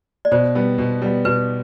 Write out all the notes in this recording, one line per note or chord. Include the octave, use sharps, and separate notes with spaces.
D5
B2 C5
G3 B3
B2
G3 B3
B2 B4